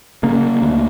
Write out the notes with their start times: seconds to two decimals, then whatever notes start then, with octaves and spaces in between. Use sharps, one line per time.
0.23 C#3 A#3
0.62 D2